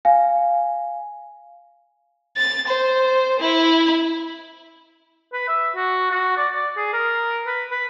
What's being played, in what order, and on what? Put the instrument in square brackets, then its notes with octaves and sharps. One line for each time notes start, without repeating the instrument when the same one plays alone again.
[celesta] F5 G#5
[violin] A6
C5
E4
[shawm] B4
E5
F#4
F#4
D5
D5
G#4
A#4
B4
B4